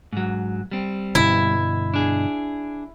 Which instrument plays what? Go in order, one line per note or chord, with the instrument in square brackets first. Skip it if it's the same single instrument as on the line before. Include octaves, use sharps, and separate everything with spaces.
[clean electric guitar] G#2 F#3
G3 C4
[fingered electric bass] G2 B2 D3 [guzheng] E4
[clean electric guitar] D4 G#4